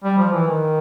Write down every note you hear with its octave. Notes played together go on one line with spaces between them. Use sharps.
G3
F3
E3
D#3